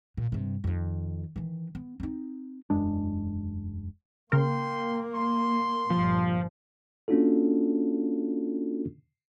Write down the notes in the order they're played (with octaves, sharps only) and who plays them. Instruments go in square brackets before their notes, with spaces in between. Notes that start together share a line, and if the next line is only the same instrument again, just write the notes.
[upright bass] A#2
G2 C3
F2 D#3
D#3 E3
B3
C4 D#4
[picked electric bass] E1 F#2 G#3 D4
[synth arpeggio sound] C#3 A#4 [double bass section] A#3 [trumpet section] G5 C6
[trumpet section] C6
[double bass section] G1 A#2 [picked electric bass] F3
[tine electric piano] A#3 C#4 D4 F4 F#4 A4